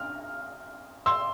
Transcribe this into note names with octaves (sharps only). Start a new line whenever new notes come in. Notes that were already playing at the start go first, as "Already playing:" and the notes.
Already playing: F6
C6 E6